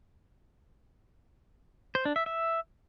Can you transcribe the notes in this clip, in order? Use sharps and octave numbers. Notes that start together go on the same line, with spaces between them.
C5
D4
E5
E5